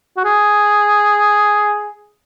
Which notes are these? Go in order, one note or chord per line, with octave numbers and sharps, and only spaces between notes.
F#4
G#4